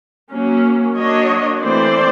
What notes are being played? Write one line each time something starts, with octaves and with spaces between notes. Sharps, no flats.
F#3 A#3 C#4
F#3 A#3 D4 C#5 D#5
E3 A3 C4 C5 D5